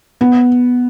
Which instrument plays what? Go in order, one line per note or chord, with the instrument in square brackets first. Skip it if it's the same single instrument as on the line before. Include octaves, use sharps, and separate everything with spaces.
[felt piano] B3